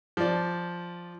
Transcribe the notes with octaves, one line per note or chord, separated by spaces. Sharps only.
F3 D5